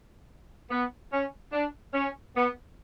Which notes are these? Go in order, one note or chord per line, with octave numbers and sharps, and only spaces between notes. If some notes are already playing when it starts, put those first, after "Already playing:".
B3
C#4
D4
C#4
B3